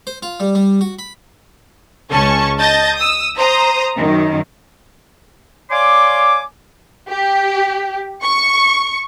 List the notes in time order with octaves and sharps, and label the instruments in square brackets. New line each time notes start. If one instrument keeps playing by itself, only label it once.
[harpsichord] C5
F4
G3
G3
F#4
B5
[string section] C#2 C#4 A5 C#6
D#5 A5 G6 A6 A#6
D#6 E6
C5 A#5 D#6
F#2 D#3
[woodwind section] C#5 D5 F5 G#5 C6 D6
[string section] G4
C#6